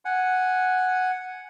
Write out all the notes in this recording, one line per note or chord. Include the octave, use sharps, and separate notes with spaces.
F#5 G#5